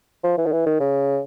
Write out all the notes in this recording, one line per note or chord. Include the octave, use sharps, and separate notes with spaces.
F3
E3
D#3
E3
D#3
C#3